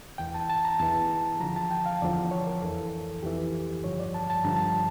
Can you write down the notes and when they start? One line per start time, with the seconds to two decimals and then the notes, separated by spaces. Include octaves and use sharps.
0.18 E2 E3 G5
0.34 A5
0.50 A5
0.65 A#5
0.79 E2 E3 A5
1.40 E2 D3 F3 A#5
1.56 A5
1.71 G5
1.86 F5
2.02 E2 D3 F3 D5
2.31 C#5
2.47 A#4
2.62 F2 E3 A4
3.23 F2 E3 G4
3.84 G2 D3 F3 C#5
3.99 D5
4.14 A5
4.30 A5
4.44 G2 D3 F3 A#5
4.56 A5